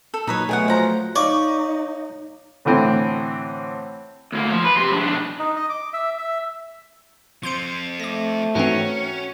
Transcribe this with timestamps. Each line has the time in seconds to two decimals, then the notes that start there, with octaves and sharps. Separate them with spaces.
0.14 A4
0.27 A#2 F#3 D#4 B4 C#5
0.49 B2 F#3 A3 G#4 C#5 F#5
0.68 F3 F#5 A#5
1.16 D#4 C#5 D5 F5 C#6
2.65 A2 D3 E3 C4
4.32 D2 A#3
4.51 F3
4.64 B4
4.77 G4 C6
4.92 F3 D4
5.07 B1 D4
5.39 D#4
5.56 D#5
5.70 D6
5.93 E5
6.18 E5
7.43 F3 C4 C6 G6 C#7
8.00 A3 D6 A#6
8.55 G#2 E3 C4 C#4 F#4 A#4 C#5